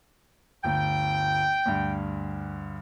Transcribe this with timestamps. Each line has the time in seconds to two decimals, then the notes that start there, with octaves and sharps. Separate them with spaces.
0.64 G1 D2 G5
1.66 D2 G2